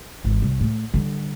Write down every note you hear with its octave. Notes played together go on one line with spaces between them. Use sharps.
G#1 E3
C2 G3
A2
D3 G3